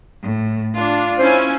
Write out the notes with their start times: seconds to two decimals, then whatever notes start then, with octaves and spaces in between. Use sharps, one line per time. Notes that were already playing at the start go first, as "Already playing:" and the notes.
0.23 A2
0.75 D4 F4
1.19 C#4 E4 C5 G#5